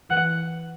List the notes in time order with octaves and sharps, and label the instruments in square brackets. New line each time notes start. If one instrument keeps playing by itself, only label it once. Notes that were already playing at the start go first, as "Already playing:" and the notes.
[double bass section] E3 [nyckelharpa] F#5